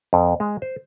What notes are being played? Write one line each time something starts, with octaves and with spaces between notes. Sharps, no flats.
F2
G#3
C5